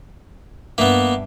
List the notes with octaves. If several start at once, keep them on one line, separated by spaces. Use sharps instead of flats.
G2 A#3 B3 E5